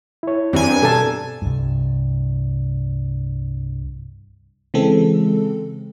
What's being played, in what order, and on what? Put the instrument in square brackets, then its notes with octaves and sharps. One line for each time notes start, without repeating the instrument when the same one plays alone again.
[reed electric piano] E4 C#5
[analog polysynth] G2 G#5 [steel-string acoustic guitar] C4 D4 A#4
[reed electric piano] B2 [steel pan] A4 A5 [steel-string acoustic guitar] A#4
[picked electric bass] C2 G2
[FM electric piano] C#3 E3 G#3 C4 A4